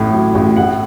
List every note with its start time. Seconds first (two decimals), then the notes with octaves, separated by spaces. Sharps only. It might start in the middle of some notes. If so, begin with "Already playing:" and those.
Already playing: A1 A2
0.12 F#3
0.35 A1
0.57 A2 F#5